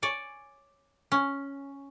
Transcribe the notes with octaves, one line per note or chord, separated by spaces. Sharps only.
C#5 D5 G#5
C#4